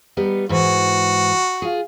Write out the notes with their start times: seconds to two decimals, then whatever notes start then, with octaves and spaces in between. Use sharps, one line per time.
0.17 G3 B3 D#4
0.49 G#2 E3 F#4
1.62 F4 G#4